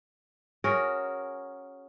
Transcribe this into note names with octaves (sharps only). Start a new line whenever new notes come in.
C#4 F#4 G#4 A#4